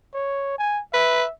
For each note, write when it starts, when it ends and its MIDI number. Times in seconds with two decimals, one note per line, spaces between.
0.14 0.55 73
0.58 0.81 80
0.94 1.23 71
0.94 1.31 76